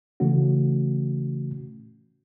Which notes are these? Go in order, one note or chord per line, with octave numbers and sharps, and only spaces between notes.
C#3 E3 A3 C#4 F#4